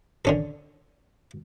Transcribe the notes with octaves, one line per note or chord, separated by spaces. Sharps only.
D3 C#4 A4